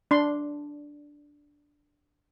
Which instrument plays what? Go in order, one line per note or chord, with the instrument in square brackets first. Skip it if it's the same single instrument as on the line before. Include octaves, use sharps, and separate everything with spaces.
[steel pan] D4 C6